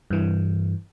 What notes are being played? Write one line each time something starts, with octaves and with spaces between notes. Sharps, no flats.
G2 E3